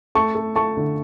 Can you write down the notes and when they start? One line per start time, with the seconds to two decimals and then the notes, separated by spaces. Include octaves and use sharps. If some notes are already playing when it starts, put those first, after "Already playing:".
0.15 A3 A5 C#6
0.35 A3
0.56 A3 A5 C#6
0.77 D3